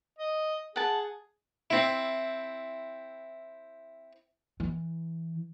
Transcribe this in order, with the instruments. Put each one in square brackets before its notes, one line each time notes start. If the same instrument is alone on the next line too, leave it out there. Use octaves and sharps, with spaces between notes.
[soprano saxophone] D#5
[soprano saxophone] G#4 [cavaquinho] F#5 A5
[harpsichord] C4 E4
[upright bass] E3